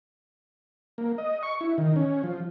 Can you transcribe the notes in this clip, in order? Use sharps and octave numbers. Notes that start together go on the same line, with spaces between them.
A#3
D#5
C#6
E4
D#3
C#4
F3